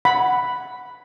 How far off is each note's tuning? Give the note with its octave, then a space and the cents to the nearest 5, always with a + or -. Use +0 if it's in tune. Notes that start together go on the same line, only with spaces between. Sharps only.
F#5 +0 B5 +0